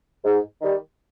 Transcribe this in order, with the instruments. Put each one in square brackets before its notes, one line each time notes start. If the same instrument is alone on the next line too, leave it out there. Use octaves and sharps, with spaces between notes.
[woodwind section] G#2
D#3 G3